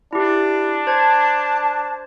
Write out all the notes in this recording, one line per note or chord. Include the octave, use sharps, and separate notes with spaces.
D4 E4 G4
C5 A5 G#6